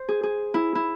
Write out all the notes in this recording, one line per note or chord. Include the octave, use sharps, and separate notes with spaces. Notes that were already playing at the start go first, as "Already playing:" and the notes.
Already playing: C5
G#4
G#4
E4
E4